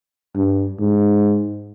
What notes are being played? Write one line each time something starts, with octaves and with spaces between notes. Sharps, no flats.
G2
G#2